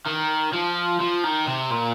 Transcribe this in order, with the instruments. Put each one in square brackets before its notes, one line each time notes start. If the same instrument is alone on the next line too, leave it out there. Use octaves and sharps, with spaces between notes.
[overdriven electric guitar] D#3
F3
F3
D#3
C3
A#2